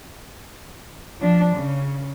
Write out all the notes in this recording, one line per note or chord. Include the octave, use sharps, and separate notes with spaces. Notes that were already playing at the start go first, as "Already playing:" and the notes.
F3 D4
C#3